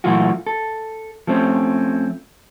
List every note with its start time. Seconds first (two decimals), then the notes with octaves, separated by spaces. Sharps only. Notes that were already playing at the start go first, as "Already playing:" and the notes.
0.04 A#2 E3 F#3 A3 F4 F#4
0.47 A4
1.27 F3 A3 C4 C#4